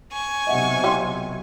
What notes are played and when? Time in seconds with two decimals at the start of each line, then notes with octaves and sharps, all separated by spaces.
0.12 G#5 C#6
0.47 B1 C3 D#5 E5 F#5
0.84 E4 F4 G4